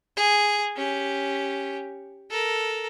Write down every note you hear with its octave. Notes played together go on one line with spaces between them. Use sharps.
G#4
C#4 G4
A4 A#4